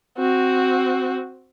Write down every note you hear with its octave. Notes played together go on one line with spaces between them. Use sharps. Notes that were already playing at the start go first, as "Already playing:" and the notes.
C4 F#4